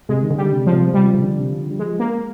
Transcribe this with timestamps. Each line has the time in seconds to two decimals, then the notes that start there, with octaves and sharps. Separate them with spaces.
0.09 C3 G#3
0.23 D#3
0.31 D3
0.38 G3
0.52 C3
0.66 F3
0.73 C3
0.94 C3 G3
1.14 C3
1.22 D3
1.39 C3
1.50 D3
1.71 G3
1.79 F3 G#3
1.99 A#3